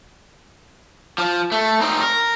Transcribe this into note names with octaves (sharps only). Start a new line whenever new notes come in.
F3
A3
C4 D#4
A#4